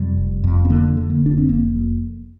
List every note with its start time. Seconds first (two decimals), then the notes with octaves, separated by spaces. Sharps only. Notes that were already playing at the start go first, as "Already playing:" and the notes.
Already playing: F2 C3 G3
0.17 F1
0.44 F2
0.65 C4
0.70 D3 A#3
0.97 D3
1.10 A#3
1.23 F1 D4
1.38 C4
1.49 F1 A#3
1.75 F2